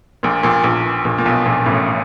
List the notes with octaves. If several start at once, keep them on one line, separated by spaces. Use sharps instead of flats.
A#1 A#2
A#1 A#2
A#1 A#2
A#1 A#2
A#2
B1 B2
A#1 A#2
A1 A2